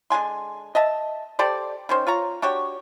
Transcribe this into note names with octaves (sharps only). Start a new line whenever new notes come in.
D3 G#3 G#5 C6
D#5 E5 A5
G4 A4 C5 D5
D#3 C#4 C5
F4 C#5 A#5
D4 F#4 G4 C#5